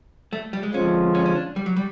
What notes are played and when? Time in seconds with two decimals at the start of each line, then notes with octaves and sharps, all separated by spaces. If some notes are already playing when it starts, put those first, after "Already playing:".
0.33 A3
0.53 G3
0.63 G#3
0.74 D3 F3 G#3 C4 C#4 F4
1.15 C#4
1.26 C#4
1.35 D4
1.56 G3
1.66 F#3
1.76 G3